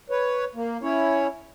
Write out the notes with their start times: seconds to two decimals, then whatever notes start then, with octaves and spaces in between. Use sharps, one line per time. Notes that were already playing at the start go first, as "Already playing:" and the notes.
0.10 B4 C#5
0.55 A#3
0.82 C#4 E4 C#5